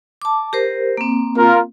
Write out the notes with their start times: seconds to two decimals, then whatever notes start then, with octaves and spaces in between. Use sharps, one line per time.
0.22 A5 D6
0.53 G4 A#4 C5
0.97 A#3 C4
1.38 F4 A#4